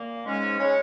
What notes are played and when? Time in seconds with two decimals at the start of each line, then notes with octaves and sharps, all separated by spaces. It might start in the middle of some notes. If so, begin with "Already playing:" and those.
Already playing: A#2 A#3
0.25 G#2 G#3 C#4
0.58 C#3 G#3 C#4 C#5